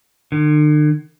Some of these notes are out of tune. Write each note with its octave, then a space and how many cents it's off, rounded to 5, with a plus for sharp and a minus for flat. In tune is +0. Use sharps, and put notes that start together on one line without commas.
D3 +45